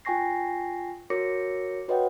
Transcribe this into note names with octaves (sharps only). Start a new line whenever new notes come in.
F4 G5 G#5 C#6 A#6 C7
F#4 A#4 C#5 D6 A#6 C#7
F#4 B4 C#5 D#5 F#5 G5